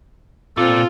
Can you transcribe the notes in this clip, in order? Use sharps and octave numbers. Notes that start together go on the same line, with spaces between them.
A#2 C4 F4 A4